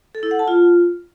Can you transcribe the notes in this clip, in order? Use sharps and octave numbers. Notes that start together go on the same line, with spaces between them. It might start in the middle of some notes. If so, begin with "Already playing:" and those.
A4
E4
F#5
A5
F4